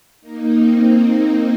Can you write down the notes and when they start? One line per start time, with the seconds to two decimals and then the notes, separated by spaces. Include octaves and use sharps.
0.21 A#3 D#4
0.53 C4